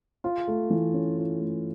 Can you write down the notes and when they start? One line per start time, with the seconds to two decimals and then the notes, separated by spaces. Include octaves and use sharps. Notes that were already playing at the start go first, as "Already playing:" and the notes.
0.24 F4
0.48 A3
0.70 E3
0.93 C#4
1.18 F4
1.40 A3